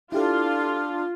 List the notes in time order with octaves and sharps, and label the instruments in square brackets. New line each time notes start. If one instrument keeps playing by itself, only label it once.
[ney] D4 [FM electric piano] E4 G4 A4 [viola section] F4